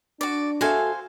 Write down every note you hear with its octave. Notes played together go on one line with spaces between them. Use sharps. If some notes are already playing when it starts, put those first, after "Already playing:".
D4 F#4 D5
F#4 A4 C5 E5 F5 G#5